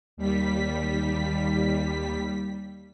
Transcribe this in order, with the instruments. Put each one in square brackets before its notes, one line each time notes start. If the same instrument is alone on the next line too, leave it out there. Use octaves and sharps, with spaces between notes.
[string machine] D#2 G3 B6